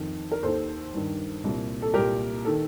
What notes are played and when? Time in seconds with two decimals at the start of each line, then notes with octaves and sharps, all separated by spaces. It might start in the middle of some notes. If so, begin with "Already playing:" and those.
Already playing: F2 D#3
0.32 A#4
0.43 D#2 D#3 A4 C5
0.94 G2 D#3
1.44 C2 A#2
1.82 A4
1.94 C2 A#2 G4 A#4
2.45 D#3 A4